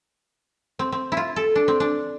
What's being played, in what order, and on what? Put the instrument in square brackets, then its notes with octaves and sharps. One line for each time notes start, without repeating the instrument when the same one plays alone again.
[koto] C4
C4
E4
F4
A4
D4
C4
D4